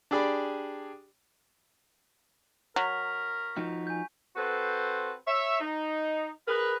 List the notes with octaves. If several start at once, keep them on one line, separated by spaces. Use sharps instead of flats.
D4 G4 G#4 D5 B5
F#3 A#4 C#6 B6 F7
F3 D#4 F#4
G#5 G6
C4 F#4 A4 B4 C5
C#5 E5
D#4
G#4 A#4 B4